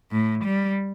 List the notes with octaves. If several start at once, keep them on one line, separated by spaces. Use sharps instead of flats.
A2
G3